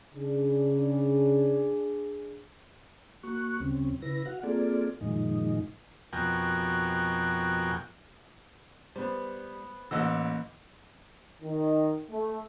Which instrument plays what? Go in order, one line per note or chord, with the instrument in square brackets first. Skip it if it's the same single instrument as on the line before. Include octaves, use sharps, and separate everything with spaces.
[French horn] C#3 [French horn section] D4 G#4
[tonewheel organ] A#3 F#4 C#6 F#6
D2 C#3 G3 C4 C#4
C#3 E4 B4 A#6
F#4 F5 F#5
A#3 C4 F4 G#4 A4 D5
F#2 A#2 D#3 F3 G#3 D#4
[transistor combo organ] F2 B2 F#4 A#4 G5 G#5
[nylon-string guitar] G3 [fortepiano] B3 C5
[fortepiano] A1 F#5 E6 [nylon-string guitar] E3 A#3 D#5
[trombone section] D#3
A3